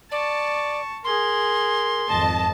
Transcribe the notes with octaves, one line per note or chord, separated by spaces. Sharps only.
D5 A5 C#6
G#4 A#4 C6
G#1 F2 D#5 A5